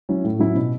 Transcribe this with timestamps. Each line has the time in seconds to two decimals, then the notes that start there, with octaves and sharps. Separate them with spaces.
0.09 F#3 C#4 E4
0.25 A2
0.39 F#3 C#4 E4
0.56 B2